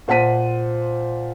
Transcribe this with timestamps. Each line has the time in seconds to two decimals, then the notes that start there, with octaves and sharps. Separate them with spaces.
0.08 A#2 C5 F#5 A5 B6 D#7